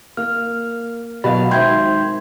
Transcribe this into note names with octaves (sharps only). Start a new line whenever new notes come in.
A#3 F6
B2 F#3 F#4 D5 D#5 F5 B5
G#2 D#3 C5 E5 G5 C6 G6 G#6